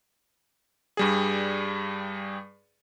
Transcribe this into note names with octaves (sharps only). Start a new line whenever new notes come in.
G2 G3 G#4